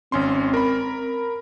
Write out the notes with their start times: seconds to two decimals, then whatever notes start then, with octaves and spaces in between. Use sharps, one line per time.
0.12 G#1 C4 C#4 C6
0.54 A#4 B5